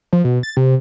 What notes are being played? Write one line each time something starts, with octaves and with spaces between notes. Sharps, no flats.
F3
B2
A6
C3